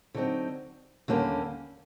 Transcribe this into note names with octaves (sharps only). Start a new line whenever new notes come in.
D3 F#3 A3 C4 D#4
D#2 D3 G3 A#3 C#4